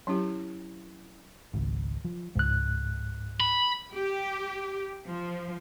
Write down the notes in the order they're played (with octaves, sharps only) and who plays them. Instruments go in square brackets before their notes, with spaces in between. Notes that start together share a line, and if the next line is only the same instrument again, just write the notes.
[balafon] F#3 C#4 E4 G4
[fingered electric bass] G#1 C#2
F3
[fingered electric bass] C#2 [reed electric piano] G#2 F#6
[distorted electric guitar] B5
[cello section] G4
F3